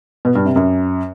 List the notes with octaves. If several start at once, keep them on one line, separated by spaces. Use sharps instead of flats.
B2
G2
C3
F#2